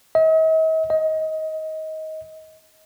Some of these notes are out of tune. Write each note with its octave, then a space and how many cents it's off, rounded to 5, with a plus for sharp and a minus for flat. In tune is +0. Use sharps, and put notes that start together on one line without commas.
D#5 +45
D#5 +20